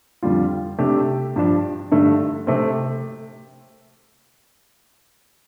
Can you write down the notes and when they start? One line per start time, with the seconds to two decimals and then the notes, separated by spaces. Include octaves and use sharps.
0.23 F2 D3 G3 F4
0.78 C3 A3 D4 G4
1.36 G2 F3 D4
1.92 G2 D3 A3
2.47 C3 A3 C4